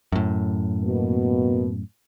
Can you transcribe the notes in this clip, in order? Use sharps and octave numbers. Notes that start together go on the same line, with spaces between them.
F#2 A2
B2 A#3